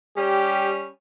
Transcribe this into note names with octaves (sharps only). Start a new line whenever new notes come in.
G3 C#4 G4